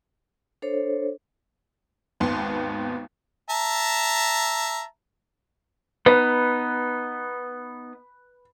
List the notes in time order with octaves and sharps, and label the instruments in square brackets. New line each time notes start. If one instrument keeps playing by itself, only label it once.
[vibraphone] D4 A4 C5 C#5
[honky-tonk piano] G#1 D#2 B3 C6
[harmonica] E5 A5 A#5
[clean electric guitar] B3 D#4 [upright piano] B4